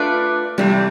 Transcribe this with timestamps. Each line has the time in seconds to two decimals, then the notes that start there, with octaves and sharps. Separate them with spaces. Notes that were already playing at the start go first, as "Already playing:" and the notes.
Already playing: A3 D4 F4 B4 D5
0.58 C3 E3 G3 A3